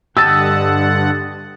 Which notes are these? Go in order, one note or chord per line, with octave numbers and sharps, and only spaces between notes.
G2 D3 G4 D#5 F#5 A5 E6